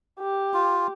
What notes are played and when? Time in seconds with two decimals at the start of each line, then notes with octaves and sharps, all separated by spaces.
0.19 G4
0.54 F4